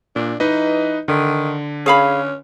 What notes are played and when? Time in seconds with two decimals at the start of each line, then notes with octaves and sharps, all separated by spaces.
0.16 A#2 D4
0.40 E3 D#4 B4 D#5
1.08 D3 D#3
1.86 C#4 G#4 F5 B5